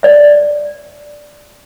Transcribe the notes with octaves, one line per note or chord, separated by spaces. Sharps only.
D5 E5